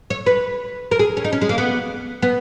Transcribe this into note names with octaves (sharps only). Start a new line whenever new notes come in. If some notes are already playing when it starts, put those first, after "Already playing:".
C#5
B4
A#4
G#4
C#4
D#4
C#4
G#3
A#3
B3
B3